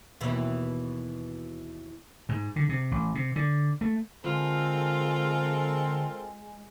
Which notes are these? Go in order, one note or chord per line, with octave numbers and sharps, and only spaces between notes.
D#2 B2 E3
G#2
D3
C3
A1
C3
D3
A3
D3 G#3 C4 F4 A4 A#4